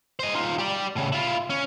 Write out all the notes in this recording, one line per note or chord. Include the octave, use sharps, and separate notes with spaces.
C5 D#5
D#4 F4
G4 D5
A2 C#3
E4 F4
C#4